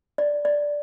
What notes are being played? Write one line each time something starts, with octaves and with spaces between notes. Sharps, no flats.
D5
D5